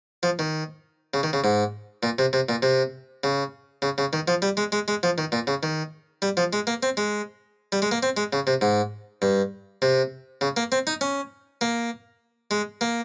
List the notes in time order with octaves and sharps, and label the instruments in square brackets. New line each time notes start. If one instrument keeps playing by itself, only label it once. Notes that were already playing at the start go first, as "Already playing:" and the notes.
[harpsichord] F3
D#3
C#3
D#3
C#3
G#2
A#2
C3
C3
A#2
C3
C#3
C#3
C#3
D#3
F3
G3
G#3
G#3
G#3
F3
D#3
A#2
C#3
D#3
G3
F3
G#3
A#3
C4
G#3
G3
G#3
A#3
C4
G#3
C#3
C3
G#2
G2
C3
C#3
A#3
C4
D#4
C#4
A#3
G#3
A#3